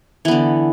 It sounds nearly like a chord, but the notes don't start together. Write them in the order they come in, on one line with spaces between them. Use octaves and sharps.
E3 B3 D3